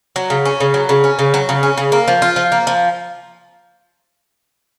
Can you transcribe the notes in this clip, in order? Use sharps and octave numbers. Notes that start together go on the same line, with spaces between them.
F#3
C#3
C#4
C#3
F#3
C#3
C#4
C#3
F#3
C#3
C#4
C#3
A#3
F3
F4
F3
A#3
F3